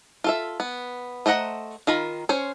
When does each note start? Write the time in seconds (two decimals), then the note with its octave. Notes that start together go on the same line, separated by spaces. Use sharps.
0.24 F4 A4 E5
0.60 B3
1.26 A3 C5 D#5 F#5 A#5
1.87 D#3 F4 A#4 B5
2.29 C#4 C5 C#5